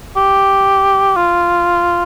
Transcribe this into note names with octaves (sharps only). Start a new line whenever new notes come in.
G4
F4